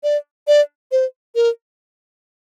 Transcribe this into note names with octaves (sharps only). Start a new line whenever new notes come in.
D5
D5
C5
A#4